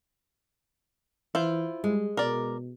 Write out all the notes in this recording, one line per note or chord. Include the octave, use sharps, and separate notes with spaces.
E3 E4 F4 C5
G3 G#3
B2 A#4 D5